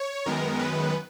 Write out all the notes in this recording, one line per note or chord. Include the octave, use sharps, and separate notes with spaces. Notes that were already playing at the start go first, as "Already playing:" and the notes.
Already playing: C#5
F#2 D#3 G#3 B3 A#4
B4